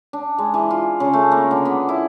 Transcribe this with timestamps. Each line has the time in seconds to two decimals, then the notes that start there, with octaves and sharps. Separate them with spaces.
0.13 D4
0.38 G#3
0.54 E3
0.71 F4
1.00 C#3
1.13 A3
1.32 A#3
1.51 D3
1.65 B3
1.89 E4